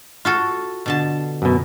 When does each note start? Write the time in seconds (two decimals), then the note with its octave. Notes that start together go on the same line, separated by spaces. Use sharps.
0.25 F4 F#4 A4
0.86 B2 D3 A5
1.42 F#2 B2